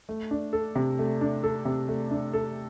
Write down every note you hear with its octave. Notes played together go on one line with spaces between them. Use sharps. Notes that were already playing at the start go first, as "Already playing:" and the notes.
A3
D4
A4
C3
A3
D4
A4
C3
A3
D4
A4